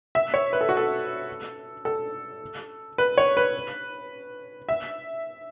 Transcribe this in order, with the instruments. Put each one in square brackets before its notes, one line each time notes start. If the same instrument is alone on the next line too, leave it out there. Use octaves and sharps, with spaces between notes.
[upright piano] E5
C#5
B4
A4
F#4
A4
A4
B4
C#5
B4
E5